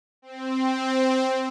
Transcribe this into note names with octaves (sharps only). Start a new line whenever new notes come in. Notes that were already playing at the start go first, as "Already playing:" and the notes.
C4